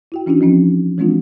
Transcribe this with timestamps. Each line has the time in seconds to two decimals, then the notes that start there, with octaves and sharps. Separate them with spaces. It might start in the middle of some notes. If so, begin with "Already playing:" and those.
0.12 E4 F#4 G5
0.26 E3 C#4 D4 E4 F#4
0.41 F3 C4 C#4 D#4
0.98 E3 G#3 C4 D4 F4 F#4